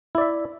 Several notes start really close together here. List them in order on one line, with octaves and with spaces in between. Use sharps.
E4 D5 E5